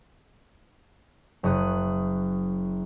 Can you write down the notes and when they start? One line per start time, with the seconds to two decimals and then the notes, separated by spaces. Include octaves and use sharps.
1.43 F#1 C#6 D#6 F#6